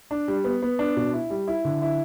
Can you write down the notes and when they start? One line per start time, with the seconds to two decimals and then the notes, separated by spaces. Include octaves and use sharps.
0.11 D4
0.28 G3
0.44 B3
0.62 B3
0.79 D4
0.96 B2
1.13 E4
1.30 G3
1.48 E4
1.65 D3
1.82 E4